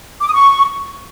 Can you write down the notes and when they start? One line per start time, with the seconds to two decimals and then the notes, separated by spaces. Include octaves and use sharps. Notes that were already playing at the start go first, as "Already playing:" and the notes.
0.21 D6
0.27 D#6
0.33 C#6